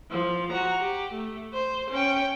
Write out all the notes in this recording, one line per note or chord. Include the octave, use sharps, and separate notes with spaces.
F3
F#4 A#5
G4
A3
C5
C#4 G5